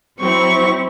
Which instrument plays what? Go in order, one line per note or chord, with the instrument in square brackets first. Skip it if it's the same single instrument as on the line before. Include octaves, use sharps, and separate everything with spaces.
[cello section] F#3 E4 [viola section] C4 [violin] C#6